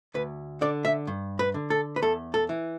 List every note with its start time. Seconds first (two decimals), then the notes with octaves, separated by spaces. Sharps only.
0.14 D2 B4
0.61 D3 D5
0.85 E5
1.07 G2
1.39 B4
1.54 D3
1.70 A4
1.96 B4
2.02 E2 A4
2.34 A4
2.49 E3